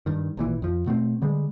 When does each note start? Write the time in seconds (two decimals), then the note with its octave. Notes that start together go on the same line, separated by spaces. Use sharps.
0.06 G2 D#3
0.37 G#1 A#2 E3
0.62 F2 F3
0.86 B2 A3 B3 C4
1.22 D3 G3 G#3